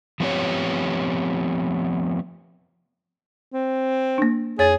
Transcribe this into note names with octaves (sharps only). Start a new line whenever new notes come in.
F3 A3 B3 C4 G4 C#5
C4
A#3 D4
F2 G#4 C#5 A6